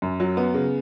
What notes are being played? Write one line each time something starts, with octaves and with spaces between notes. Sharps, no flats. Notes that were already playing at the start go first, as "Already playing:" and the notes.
F#2
F#3
B3
C#3